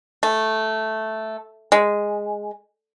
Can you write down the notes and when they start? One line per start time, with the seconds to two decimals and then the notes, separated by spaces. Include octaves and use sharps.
0.23 A3
1.72 G#3